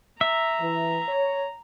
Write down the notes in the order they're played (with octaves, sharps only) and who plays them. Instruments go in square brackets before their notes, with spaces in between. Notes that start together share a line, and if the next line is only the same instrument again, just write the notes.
[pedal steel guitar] E5 [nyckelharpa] A#5
[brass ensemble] E3
C#5